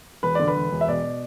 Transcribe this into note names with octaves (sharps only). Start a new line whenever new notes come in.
E1 B4
D3 D5
B4
E1
E1
E5
B2 D5